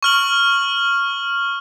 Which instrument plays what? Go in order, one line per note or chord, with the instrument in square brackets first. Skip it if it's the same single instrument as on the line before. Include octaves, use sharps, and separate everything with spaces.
[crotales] C#6 F6 F#7